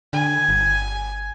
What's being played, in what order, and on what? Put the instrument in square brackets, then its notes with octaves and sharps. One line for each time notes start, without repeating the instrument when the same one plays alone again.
[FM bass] D3 [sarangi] G#5
[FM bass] G1